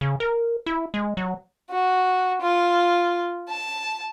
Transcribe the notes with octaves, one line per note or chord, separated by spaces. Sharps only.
C#3
A#4
E4
G#3
F#3
F#4
F4
A5